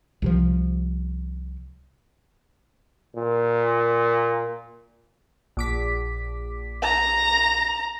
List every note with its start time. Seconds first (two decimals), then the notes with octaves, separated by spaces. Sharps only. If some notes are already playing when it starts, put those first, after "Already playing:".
0.22 C2 C3 F3
3.16 A#2
5.57 A#1 D6 B6
6.82 A#5